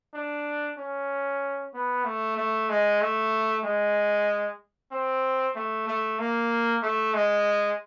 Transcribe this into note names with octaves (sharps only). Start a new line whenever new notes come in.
D4
C#4
B3
A3
A3
G#3
A3
G#3
C4
A3
A3
A#3
A3
G#3